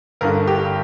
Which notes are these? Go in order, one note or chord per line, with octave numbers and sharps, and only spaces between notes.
G1 G2 D3 A#4
G4